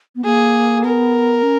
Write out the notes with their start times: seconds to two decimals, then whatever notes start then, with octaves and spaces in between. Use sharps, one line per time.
0.16 B3
0.24 A#3 G#4
0.84 B3 A#4
1.43 C#4